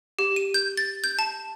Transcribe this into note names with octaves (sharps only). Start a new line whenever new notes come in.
G4
D#7
G6
A6
G6
A5